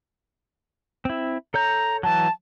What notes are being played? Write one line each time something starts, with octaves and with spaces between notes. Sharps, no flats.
C4 E4
A4 C#5 A#5 G6
E3 F#3 A5